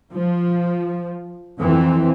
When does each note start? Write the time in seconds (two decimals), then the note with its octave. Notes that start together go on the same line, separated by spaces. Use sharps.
0.12 F3
1.60 F2 E3 C4